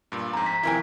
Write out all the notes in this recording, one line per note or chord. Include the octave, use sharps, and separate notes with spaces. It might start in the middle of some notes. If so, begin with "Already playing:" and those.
G2 A#2
F2 G#2 A#5
B6
F2 C3 E4 A#4 G5 G#5